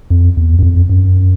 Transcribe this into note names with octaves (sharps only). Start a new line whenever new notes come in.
F2
E2
F#2
F2
F#2